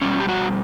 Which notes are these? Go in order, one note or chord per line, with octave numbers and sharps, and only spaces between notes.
B2 G3 C#4
G4
F#4